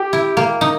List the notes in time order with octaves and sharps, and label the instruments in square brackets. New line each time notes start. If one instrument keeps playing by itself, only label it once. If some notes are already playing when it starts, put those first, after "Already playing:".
Already playing: [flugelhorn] G4
[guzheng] E4
A#3
D#4